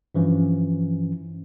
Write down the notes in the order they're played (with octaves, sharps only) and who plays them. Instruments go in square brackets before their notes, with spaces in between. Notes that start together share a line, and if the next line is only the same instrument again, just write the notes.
[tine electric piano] G2 E3 F3 C#4